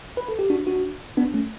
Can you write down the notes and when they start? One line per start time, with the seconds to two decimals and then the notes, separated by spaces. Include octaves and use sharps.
0.17 B4
0.28 A4
0.39 G4
0.50 D4 F#4
0.67 D4 F#4
1.17 B3 D4
1.34 A3 C#4